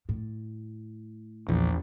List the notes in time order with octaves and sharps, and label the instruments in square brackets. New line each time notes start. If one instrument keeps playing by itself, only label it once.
[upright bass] A2
[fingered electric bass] A#1 [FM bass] E2